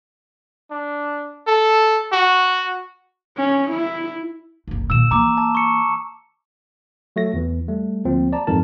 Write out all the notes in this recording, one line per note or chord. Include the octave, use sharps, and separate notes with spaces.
D4
A4
F#4
C#4
E4
F#1 C2
A#2 D#3 E6 E7
E3 A#3 A#5 D6
A5
C#6 C#7
F#3 A3 F#4 A#6
E2 E3
G3 A3
D2 F3 A#3 C4
D5 A5 A#5
F2 G#2 E3 A#4 A5